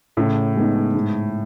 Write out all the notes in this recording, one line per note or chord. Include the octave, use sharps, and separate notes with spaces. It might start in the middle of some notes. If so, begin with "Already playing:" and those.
A2 C#3
G#3 B3 D#4
G#2